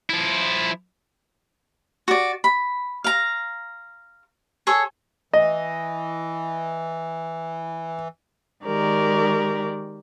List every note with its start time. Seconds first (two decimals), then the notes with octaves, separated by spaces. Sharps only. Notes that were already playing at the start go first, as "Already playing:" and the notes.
0.10 F3 E4
2.08 F#4 D5
2.44 B5
3.04 F5 A#5
4.67 G#4 A4 C#5
5.33 E3 D#5
8.65 D#3 G#3 G4 A#4 D5